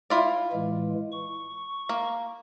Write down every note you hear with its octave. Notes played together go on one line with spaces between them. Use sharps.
E4 F4 D5
A2 E3 G#3
C#6
A#3